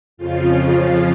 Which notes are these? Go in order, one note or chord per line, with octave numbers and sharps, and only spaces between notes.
F2 C#3 F3 F4